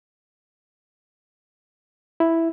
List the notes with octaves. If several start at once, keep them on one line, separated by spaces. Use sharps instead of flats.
E4